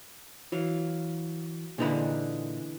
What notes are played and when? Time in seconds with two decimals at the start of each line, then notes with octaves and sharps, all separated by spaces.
0.52 E3 F#3 F5
1.78 A#2 D3 E3 G#3 D#4 B5